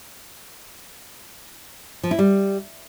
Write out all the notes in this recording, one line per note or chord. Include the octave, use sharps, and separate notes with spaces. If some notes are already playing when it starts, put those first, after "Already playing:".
F3
E4
G3